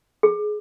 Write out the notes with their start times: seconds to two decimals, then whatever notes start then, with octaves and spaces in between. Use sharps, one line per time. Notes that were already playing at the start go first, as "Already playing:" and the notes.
0.23 G#4